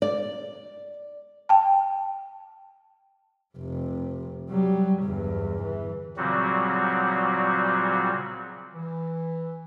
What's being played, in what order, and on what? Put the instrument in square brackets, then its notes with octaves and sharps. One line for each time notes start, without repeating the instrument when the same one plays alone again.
[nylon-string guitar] D5
[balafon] G5 A5
[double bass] F1 C3
F#3 G3
G1 E2
E3
[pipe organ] A#2 C#3 F#3 G3 C4 F#4
[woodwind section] E3